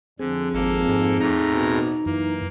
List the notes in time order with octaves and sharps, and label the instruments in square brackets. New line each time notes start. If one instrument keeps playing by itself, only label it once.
[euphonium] F2 [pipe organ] D3 [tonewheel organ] C4 G#4
[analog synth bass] G#1 [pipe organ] A#3 A4
[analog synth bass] G#2
[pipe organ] E2 A2 A#5 [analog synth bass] D#4
[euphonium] B2
[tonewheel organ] F#2 [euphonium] E3 [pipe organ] A#3